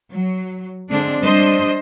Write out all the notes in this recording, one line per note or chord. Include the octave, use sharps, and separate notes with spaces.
F#3
D3 G#3 C4 D4
G3 D4 C5 D#5